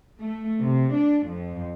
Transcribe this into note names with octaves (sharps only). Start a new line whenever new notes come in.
A3
C3
D4
F2